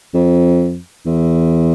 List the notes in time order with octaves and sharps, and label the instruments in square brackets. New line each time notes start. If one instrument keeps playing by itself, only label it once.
[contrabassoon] F2
E2